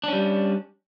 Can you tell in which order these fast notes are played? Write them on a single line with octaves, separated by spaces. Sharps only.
D4 C#4 G3